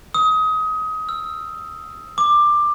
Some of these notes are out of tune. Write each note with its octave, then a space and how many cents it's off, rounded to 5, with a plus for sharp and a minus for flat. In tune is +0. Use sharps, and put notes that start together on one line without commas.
D#6 +25
E6 +30
D6 +15